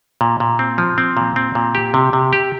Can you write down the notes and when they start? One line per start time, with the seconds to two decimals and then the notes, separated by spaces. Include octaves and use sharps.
0.21 A#2
0.40 A#2
0.59 C4
0.78 F3
0.98 C4
1.17 A#2
1.36 C4
1.55 A#2
1.75 G4
1.94 C3
2.13 C3
2.33 G4